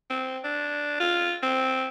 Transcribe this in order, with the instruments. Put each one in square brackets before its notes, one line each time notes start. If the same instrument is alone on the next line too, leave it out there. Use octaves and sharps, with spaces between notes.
[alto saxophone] C4
D4
F4
C4